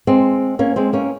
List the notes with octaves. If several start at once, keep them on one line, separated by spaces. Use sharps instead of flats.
G#3 C4
A#3 C#4
G#3 C4
A#3 C#4